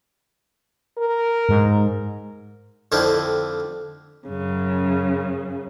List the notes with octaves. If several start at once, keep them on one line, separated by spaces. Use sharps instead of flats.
A#4
G#2
F2 D3 F3 C4 E4
F#2 C#3